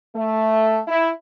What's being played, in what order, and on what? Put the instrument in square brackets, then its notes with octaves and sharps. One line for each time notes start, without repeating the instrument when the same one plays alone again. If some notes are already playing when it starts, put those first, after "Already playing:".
[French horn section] A3
E4